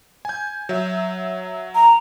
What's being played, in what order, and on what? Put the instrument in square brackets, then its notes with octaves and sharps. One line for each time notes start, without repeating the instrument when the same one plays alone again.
[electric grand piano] G#5 G6
F#3 E5
[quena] A#5